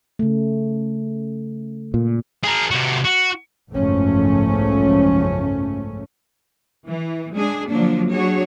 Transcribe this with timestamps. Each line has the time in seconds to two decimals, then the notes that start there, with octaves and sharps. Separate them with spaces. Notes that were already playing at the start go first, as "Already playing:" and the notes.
0.19 C#3 A3
1.94 A#2
2.44 G#4 A#4
2.71 C3 F#4
3.05 F#4
3.71 F#1 B1 G#2 F3 A3 C#4
6.86 E3
7.35 G#3 D4 G#4
7.68 D3 F3 F#3 A#3 D4
8.12 F#3 D4 F#4 G#4 C#5